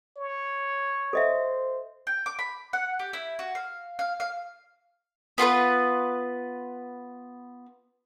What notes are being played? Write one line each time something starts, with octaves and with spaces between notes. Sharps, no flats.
C#5
A4 C5 D#5 E5
G5
D6
B5
F#5
G4
E4
F#4
F5
F5
F5
B3 F4 A#4 B4